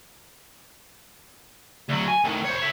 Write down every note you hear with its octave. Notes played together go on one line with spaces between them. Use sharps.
D2 F#3
G#5
A2 D#3
C5 C#5
C#5 E5